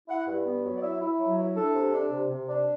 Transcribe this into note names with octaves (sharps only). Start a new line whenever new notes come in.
E4 F#5
G2
B3
F#3
D5
E4 E5
E4
F#3
E4
D4 A4
C3
D4
C3
C3
D4